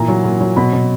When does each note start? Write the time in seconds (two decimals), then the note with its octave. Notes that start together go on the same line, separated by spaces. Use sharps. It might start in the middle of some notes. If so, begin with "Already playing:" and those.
Already playing: A#2 E3 A#5
0.08 F#3
0.24 A#2
0.41 F#3
0.56 B2 B5
0.73 B2